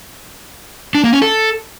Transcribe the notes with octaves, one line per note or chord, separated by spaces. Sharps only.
D4
A#3
C#4
A4